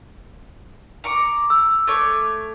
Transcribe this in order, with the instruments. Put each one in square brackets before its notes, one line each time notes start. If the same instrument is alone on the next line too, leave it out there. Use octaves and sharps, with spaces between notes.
[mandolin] A#5 C#6 D6
[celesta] E6
[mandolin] A3 C#5 D6